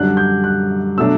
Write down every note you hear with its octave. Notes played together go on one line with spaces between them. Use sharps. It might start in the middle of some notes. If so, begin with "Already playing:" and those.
Already playing: F#2 D3 G3 D4 F#6
G6
F#6
B2 F#3 A3 D4 E6